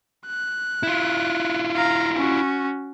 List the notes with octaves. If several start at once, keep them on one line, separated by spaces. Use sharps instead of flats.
F#6
E4 F4
F5 A#5
C#4 F#4